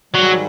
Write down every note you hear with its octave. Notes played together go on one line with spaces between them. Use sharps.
G#2 D#3 F#3 G3